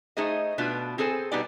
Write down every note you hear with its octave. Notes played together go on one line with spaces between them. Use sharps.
A3 D#4 G#4 C5 D#5
B2 A3 D4 F4 B4
C4 G#4 A4 C5 G#5
B2 G3 B3 D#4 G4 D5